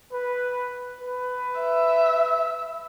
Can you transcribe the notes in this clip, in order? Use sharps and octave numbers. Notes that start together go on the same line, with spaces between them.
B4
B4
E5